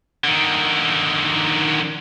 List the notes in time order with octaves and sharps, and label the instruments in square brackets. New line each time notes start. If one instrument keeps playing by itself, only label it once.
[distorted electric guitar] D3 D#3